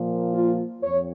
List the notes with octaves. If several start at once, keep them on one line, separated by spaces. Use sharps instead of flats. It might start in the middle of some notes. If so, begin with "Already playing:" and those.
Already playing: A#2 F3 A#3
F4
F2 C#5